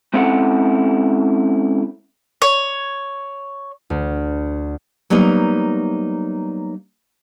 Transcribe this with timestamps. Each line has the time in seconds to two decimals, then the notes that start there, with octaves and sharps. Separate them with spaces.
0.14 G#3 C4 C#4 E4 A4 F#5
2.42 C#5
3.90 D2
5.10 F#3 G3 A#3 B3 D#4